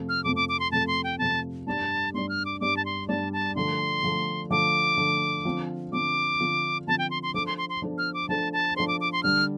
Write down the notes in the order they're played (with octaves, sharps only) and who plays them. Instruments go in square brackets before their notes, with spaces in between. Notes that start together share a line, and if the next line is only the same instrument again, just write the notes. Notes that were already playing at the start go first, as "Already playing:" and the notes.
Already playing: [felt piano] F2 C3 F3 A3
[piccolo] F6
[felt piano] F2 C3 F3 A3 [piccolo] D6
[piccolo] D6
D6
C6
[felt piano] F2 C3 F3 A3 [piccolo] A5
[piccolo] C6
G5
[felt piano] F2 C3 F3 A3 [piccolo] A5
[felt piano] G2 G3 D4 G4 D5 [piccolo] A5
[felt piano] G2 G3 D4 G4 D5 [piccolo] C6
[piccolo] F6
D6
[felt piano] G2 G3 D4 G4 D5 [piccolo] D6
[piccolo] A5
C6
[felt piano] G2 G3 D4 G4 D5 [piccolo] A5
[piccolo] A5
[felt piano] D3 F3 A3 [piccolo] C6
[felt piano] D3 F3 A3
[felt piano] D3 F3 A3 [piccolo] D6
[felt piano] D3 F3 A3
D3 F3 C4 F4
[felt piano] D3 F3 C4 F4 [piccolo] D6
[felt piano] D3 F3 C4 F4
[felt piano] D3 F3 C4 F4 [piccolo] A5
[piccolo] G5
C6
C6
[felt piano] F3 D4 A4 C5 [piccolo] D6
[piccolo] C6
C6
C6
[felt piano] F3 D4 A4 C5
[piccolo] F6
D6
[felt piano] F3 D4 A4 C5 [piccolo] A5
[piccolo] A5
[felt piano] F3 D4 A4 C5 [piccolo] C6
[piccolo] D6
D6
C6
[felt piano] D3 G3 D4 [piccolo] F6